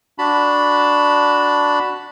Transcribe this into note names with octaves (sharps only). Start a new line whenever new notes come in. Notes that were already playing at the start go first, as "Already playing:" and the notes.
D4 F#4 A5 B5